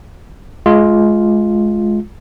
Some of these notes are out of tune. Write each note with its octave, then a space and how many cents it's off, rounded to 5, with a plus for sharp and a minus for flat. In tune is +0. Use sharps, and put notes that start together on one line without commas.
G#3 +25 F4 +0